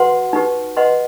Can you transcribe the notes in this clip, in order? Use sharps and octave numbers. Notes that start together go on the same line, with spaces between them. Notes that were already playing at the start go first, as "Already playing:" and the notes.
Already playing: F#4 B4 F#5 C6
D#4 G4 B4
B4 D#5 F#5 C6